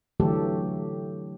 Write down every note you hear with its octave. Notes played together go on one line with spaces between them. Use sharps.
D3 E3 F#3 A3 G4 A4